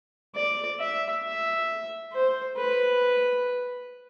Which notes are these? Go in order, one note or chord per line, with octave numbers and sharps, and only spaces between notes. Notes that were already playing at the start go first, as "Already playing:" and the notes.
D5
E5
E5
C5
B4